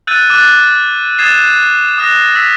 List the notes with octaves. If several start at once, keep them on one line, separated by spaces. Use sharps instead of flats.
E6 F#6 G6 A6 D#7
D6 F#6 A6
D#6 G#6 A6 C7 E7
D#6 F#6 A#6
E6 B6